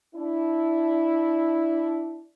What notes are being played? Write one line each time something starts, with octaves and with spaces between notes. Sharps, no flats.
D4 E4